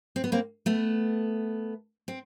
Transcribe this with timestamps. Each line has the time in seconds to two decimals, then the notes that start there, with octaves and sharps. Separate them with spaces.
0.16 C4
0.24 B3
0.32 A#3 C4
0.66 A3 B3
2.08 C4